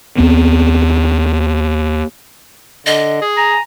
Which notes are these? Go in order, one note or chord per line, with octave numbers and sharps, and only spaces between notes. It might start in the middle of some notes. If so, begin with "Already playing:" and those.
D#2 B3 C4
D3 D#5
G#4
G#5 A#5